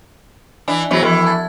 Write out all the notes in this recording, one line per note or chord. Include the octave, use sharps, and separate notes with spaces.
E3 D4 G#5
G#2 E3 F#3 B3 F#4
E3 F3
A5 G#6 A6